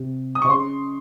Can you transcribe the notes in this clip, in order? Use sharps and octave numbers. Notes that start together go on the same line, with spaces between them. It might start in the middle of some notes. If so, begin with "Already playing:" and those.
Already playing: C3
D#6
C#6
C3
C#3 C6